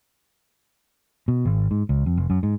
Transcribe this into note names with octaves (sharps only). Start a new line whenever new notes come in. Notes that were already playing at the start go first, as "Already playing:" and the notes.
B2
G#1
G#2
C#2
F2
F1
F#2
G#2